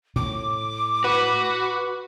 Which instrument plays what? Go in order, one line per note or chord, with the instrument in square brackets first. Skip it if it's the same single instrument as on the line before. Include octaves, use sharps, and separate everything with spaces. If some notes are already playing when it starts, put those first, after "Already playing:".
[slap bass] A2 [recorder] D6
[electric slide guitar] F#4 [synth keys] B4